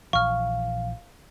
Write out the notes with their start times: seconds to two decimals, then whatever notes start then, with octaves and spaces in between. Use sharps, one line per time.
0.13 A#1 E3 F5 C#6 F6